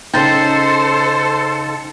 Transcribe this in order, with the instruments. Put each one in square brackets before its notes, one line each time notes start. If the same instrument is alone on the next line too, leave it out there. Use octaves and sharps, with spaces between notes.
[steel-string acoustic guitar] C#3 D#4 [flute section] A4 [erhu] C5 [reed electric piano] G5 G6 A6